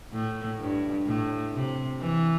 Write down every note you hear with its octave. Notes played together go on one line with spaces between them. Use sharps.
A2
G2
A2
C3
E3